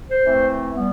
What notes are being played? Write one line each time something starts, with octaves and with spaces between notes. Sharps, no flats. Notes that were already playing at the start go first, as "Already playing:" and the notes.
C5
E3 A3 C4
G3 B3